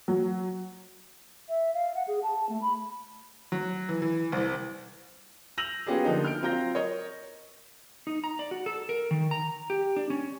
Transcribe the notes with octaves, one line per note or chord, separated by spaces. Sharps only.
F#3
E5
F5
F#5
G#4
A5
A3
B5
F#3
E3
E3
C2
E6 G6 A#6 D#7 F7 F#7
F#3 B3 C#4 F4 G4 G#4
D3 F3 A#3 D#4
F6 G6 D7
F#3 C4 F4 A#5 G6 A#6
A#4 C#5 D#5
D#4
A#5
D5
F#4
A4
A#4
D#3
A#5
G4
D4
C#4